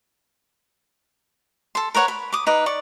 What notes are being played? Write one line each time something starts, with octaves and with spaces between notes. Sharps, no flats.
A4 C6
A#4 B4 C#5 F#5
B5
D6 D#6
D#4 B4 D6
D5 C#6